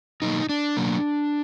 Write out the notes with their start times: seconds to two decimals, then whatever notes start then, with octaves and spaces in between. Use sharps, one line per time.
0.22 B2 F#3 A#3 D#4
0.49 D4
0.77 B2 F#3 A#3